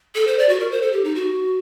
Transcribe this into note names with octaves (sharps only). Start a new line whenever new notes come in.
A4
C5
D5
F#4
A#4
C5
A4
G4
D#4
F#4